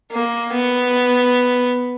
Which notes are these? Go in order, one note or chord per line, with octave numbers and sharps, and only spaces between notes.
A#3
B3